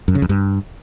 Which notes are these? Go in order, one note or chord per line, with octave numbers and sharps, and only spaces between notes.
F#2
C#3
F2
G2